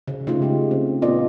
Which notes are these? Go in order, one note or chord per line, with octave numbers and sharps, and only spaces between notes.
C#3
C#3 A3 D#4 F4
G#3 G4
C4
A#2 B3 F4 A4 D5 D#5